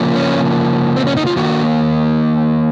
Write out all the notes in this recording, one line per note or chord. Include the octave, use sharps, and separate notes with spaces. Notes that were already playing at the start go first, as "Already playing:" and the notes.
Already playing: C#3 F3 A#3
C#4
C4
C#4
D#4
F4
D#3 A#3 F#4